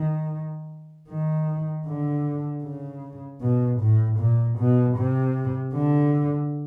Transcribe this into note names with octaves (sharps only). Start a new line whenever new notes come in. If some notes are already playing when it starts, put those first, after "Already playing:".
Already playing: D#3
D#3
D3
C#3
B2
A2
A#2
B2
C3
D3